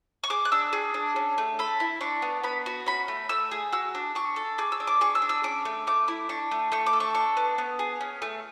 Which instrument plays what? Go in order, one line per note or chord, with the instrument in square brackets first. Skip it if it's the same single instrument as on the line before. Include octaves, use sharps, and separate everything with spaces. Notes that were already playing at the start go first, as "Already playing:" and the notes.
[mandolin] C#6
G#4 D6
F#6
D4 E6
G#4
D4
C#4
A3
A4 B5
E4
D4 C#6
B3
B3 B5
F#4
C#4 B5
A3
A3 E6
G#4
F#4 E6
D4
D4 C#6
A4
G#4 D6
E6
D4
D6
G#4 C#6
E6
D4
E6
C#4 D6
A3
A3 D6
E4
D4 C#6
A3
A3 C#6
D6
A4
C#6
D4 C#6
B3
B3
G#4
C#4
A3